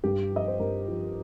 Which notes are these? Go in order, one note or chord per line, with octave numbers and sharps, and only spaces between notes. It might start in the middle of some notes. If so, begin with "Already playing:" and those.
G2 G4
F3 D#5
C5
G2 A#4
F3